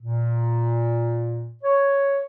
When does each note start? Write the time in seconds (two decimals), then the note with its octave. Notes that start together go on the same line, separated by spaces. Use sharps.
0.02 A#2
1.64 C#5